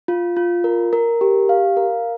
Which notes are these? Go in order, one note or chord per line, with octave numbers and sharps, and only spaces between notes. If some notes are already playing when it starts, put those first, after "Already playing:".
F4
F4
A#4
A#4
G4
F5
A#4